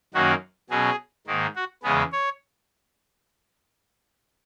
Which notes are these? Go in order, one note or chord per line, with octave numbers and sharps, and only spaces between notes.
F#2 D#3 A#3 C#4 F#4
B2 F#3 C#4 G#4
G#2 D#3 A#3
F#4
E2 C#3 G#3 B3 G#4
C#5